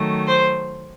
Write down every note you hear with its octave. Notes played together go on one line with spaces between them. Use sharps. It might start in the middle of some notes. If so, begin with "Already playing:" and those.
Already playing: D#3 F#3 A3
C5